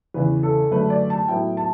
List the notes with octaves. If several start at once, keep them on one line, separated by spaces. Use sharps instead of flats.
E2 C#3 E3 B4
A4
F#2 D3 A3 B4
D5
A5
A2 F#3 B3 E4 G5
A5